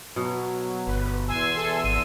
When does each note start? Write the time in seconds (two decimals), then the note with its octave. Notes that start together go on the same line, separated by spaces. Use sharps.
0.16 B2 F#3
0.87 G1 B4
1.29 E2 G#5 C6 E6
1.57 A4
1.84 G#1 D#7